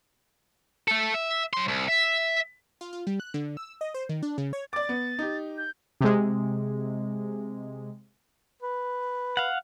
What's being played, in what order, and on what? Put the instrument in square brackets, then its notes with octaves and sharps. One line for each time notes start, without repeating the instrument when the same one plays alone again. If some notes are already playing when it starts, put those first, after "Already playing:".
[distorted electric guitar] A3 A4
E5
F#3 C6
C2
E5
[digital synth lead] F4
F4
G3
F#6
D3
E6
D#5
C5
D#3
D4
C#3
C#5
[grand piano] D5 D6 [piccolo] A6
[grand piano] B3
D#4 G4
[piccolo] G6
[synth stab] C3 G#3
[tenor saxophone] B4
[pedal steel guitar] F5 F#5